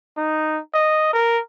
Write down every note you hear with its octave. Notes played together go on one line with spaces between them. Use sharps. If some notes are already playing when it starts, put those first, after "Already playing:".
D#4
D#5
A#4